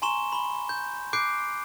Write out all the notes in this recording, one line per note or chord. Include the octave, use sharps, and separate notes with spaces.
G#5 A#5 C6 C#6 E7 G7
B5 G7
G6
D6 F#6 G6 C7 D7